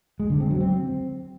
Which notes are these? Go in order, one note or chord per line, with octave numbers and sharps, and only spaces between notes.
G#3
D3
C4
F#3
C4